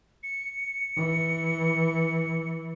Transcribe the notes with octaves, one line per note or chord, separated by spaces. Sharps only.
C#7
E3